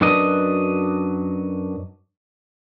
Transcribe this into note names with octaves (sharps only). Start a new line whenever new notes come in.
F#2 F#3 D4 B4 D#5